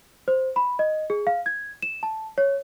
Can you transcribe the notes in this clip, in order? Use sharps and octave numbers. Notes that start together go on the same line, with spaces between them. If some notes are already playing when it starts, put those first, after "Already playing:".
C5
B5
D#5
G#4
F5
G#6
E7
A5
C#5